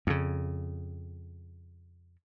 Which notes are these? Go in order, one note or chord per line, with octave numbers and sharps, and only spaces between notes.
F2 C#3